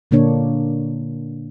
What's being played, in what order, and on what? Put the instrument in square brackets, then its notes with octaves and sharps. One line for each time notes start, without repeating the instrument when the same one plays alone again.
[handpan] A#2 D3 A#3 D4 C#5